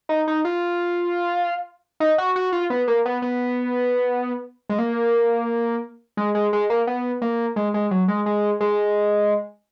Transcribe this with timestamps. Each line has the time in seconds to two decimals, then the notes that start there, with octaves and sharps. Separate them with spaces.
0.09 D#4
0.28 D#4
0.45 F4
2.00 D#4
2.18 F#4
2.36 F#4
2.52 F4
2.70 B3
2.88 A#3
3.06 B3
3.22 B3
4.70 G#3
4.79 A#3
6.17 G#3
6.35 G#3
6.53 G#3
6.70 A#3
6.87 B3
7.22 A#3
7.56 G#3
7.74 G#3
7.91 F#3
8.08 G#3
8.26 G#3
8.61 G#3